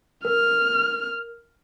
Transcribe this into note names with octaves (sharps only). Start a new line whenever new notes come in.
A#4 F6